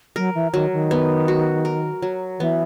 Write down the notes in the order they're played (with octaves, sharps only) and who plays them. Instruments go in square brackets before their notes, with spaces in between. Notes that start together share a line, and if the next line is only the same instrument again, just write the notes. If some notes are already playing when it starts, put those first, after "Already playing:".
[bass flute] F#3 [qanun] A#4
[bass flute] E3
[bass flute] D#3 [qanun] F#3
[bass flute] D#3
[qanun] B3
F#4
A#4
F#3
[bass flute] E3 [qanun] B3